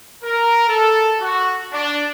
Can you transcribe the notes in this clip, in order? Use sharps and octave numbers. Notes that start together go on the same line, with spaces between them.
A#4
A4
F#4
D4